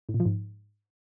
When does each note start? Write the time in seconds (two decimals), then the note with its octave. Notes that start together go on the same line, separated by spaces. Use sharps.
0.09 A2
0.14 A#2
0.20 F3
0.26 G#2